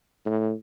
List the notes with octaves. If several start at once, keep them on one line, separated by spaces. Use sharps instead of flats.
A2